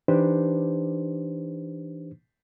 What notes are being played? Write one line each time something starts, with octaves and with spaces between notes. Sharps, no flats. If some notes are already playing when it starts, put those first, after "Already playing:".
E3 D4 D#4 G4 B4 C5